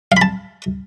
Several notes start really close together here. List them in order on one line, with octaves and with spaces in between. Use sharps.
F5 B5 A5